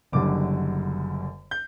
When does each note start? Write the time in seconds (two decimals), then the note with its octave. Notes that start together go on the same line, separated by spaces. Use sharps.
0.12 F#1 F#2 D3 G3 D6
1.51 G6